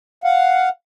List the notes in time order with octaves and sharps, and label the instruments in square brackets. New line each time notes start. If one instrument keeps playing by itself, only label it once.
[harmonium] F5 F#5